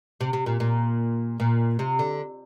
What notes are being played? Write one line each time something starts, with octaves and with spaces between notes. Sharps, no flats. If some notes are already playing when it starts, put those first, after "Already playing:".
C3
C3
A#2
A#2
A#2
C3
D3